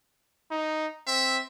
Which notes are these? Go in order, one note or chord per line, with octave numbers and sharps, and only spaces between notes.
D#4
C4 E5